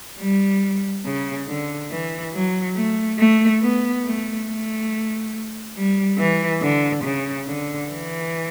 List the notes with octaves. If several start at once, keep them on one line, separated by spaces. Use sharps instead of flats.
G3
C#3
D3
E3
F#3
A3
A3
B3
A3
A3
G3
E3
D3
C#3
D3
E3